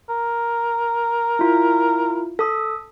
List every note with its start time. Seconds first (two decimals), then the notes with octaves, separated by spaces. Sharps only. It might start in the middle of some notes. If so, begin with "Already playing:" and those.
0.09 A#4
1.39 E4 F4
2.39 A4 D#6